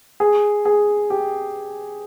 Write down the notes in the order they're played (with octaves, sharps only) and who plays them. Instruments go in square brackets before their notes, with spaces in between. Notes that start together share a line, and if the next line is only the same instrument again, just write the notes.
[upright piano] G#4
G#4
G4